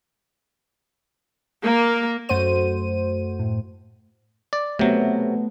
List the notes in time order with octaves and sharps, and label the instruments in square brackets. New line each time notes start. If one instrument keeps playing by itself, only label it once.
[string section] A#3
[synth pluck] F#2 A3 F#4 C5 D#7
A2
[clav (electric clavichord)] D5
[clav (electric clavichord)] C3 F#3 [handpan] A3 B3